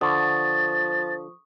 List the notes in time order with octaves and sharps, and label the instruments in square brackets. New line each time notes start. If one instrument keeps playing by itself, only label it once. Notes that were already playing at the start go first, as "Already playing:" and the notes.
[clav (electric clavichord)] D3 [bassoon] F3 [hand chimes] C#6 D#6 [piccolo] A6